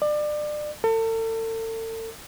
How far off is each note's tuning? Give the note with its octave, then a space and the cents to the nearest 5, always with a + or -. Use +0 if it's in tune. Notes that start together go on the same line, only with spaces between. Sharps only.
D5 +30
A4 +40